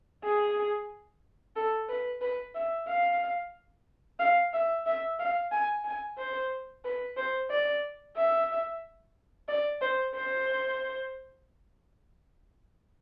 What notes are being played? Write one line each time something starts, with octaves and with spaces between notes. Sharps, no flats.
G#4
A4
B4
B4
E5
F5
F5
E5
E5
F5
G#5
G#5
C5
B4
C5
D5
E5
D5
C5
C5